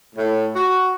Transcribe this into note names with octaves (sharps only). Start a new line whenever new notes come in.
A2
F#4